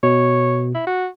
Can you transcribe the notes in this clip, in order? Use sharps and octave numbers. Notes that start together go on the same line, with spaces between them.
B2 C#5
E4
F#4